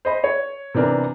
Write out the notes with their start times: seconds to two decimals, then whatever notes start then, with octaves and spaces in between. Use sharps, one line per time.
0.05 C5 D#5 B5
0.24 C#5
0.75 C3 E3 B3 D4 A#4